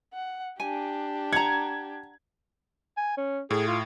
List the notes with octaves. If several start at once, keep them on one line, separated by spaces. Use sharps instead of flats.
F#5
D4 G4 G#5
F#5 A#5 G#6
G#5
C#4
A2 G#4
F4